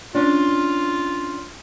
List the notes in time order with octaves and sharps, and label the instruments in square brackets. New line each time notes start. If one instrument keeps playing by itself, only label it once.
[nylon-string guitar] C#4 D4 [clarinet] F4